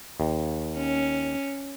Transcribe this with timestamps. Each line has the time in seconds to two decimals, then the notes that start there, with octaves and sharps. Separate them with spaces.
0.20 D#2
0.77 C#4